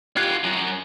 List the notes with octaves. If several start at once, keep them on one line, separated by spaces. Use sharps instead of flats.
F4 G4 F#6 G#6 C7
F#2